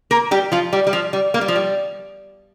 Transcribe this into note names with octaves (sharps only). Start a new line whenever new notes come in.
A#3 A#4
G3 G4
F3 F4
G3 G4
G3
F3
G3
A#3
G3
F3
G3